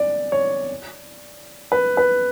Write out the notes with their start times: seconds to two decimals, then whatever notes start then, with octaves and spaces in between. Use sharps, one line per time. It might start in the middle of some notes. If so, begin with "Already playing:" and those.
Already playing: D5
0.32 C#5
1.72 B4
1.97 B4